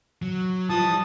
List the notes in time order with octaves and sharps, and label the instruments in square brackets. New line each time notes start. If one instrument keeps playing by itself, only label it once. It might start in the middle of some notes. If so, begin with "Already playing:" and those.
[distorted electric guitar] F#3
[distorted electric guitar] E3 [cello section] F3 G3 [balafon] F4 [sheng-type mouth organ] A5 D#6